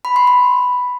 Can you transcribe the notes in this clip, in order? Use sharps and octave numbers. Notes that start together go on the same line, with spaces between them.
B5
C6
B5